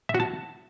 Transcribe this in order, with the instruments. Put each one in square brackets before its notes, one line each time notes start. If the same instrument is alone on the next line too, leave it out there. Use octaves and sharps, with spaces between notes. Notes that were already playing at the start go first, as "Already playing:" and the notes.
[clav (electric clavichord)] E5
F#4
A5